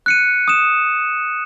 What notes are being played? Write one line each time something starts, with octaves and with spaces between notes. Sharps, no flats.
F#6 C#7 D#7
D#6 E7